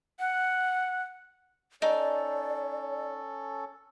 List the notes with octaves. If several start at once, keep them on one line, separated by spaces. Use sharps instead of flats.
F#5
C#4 D#4 A4 D5